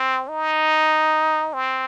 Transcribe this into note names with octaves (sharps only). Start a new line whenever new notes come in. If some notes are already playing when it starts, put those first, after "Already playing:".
Already playing: C4
D#4
C4